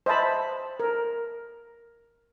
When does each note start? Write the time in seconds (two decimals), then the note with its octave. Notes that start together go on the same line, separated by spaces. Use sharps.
0.06 C5 D#5 E5 A5 B5
0.80 A#4